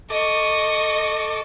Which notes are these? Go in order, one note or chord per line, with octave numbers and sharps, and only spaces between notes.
A4 D#5 C#6 D6